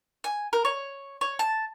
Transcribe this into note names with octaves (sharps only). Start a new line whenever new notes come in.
G#5
A#4
C#5
C#5
A5